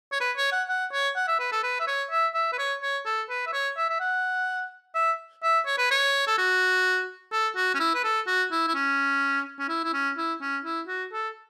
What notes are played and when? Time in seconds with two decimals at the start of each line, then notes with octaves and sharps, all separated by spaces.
0.12 C#5
0.21 B4
0.37 C#5
0.52 F#5
0.69 F#5
0.93 C#5
1.16 F#5
1.28 E5
1.40 B4
1.52 A4
1.63 B4
1.80 E5
1.87 C#5
2.11 E5
2.34 E5
2.53 B4
2.59 C#5
2.82 C#5
3.06 A4
3.29 B4
3.47 E5
3.53 C#5
3.77 E5
3.90 E5
4.00 F#5
4.95 E5
5.43 E5
5.66 C#5
5.78 B4
5.91 C#5
6.27 A4
6.38 F#4
7.32 A4
7.56 F#4
7.75 C#4
7.80 E4
7.95 B4
8.04 A4
8.27 F#4
8.52 E4
8.67 E4
8.75 C#4
9.59 C#4
9.69 E4
9.84 E4
9.93 C#4
10.17 E4
10.41 C#4
10.65 E4
10.88 F#4
11.12 A4